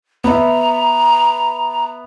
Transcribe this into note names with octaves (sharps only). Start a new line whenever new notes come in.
B3 E5 A#5